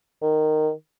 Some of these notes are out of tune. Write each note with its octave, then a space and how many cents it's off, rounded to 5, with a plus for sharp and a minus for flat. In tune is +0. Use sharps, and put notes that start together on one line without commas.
D#3 -10